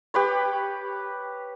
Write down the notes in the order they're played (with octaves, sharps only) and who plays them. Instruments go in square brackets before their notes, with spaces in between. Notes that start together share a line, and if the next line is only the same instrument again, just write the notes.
[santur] G4 B4 C#5